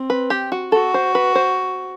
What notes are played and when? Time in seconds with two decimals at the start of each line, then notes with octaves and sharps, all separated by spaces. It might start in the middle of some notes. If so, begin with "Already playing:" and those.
Already playing: C4
0.10 B4
0.30 G4
0.52 F#4
0.72 F#4 A4
0.94 C5
1.15 B4
1.35 C5